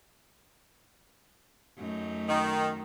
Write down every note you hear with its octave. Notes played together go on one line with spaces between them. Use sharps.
F#2 A3 D#4
D#3